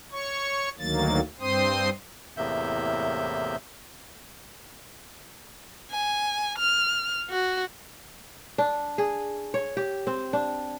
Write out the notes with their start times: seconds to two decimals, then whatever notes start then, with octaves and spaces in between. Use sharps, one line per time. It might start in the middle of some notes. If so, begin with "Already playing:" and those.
0.12 C#5 C#6
0.79 D2 D#3 F#3 A#3 A6
1.40 G2 C4 C5 C6 D#6
2.37 E2 A2 C3 A#3 E5 G6
5.91 G#5
6.58 F6
7.30 F#4
8.58 D4
8.98 G#4
9.54 C#5
9.77 G4
10.07 C4
10.33 D4